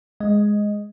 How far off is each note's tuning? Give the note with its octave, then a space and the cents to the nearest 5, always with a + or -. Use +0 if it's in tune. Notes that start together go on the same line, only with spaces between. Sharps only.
G#3 +0 D#5 +0